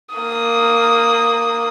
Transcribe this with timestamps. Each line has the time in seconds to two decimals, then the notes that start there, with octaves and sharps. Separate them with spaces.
0.15 A#3 D#6